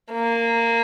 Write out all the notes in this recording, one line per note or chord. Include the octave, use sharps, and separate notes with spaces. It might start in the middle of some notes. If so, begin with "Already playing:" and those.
A#3